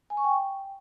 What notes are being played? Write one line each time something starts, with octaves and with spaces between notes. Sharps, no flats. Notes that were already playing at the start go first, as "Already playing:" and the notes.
G#5
C#6
G5